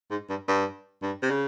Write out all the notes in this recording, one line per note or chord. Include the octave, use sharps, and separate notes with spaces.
G#2
G2
G2
G2
C3
C#3